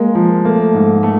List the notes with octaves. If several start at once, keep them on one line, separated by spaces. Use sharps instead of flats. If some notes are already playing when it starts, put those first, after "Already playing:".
Already playing: G#3 A#3
F3
A3 A#3
G#2
A3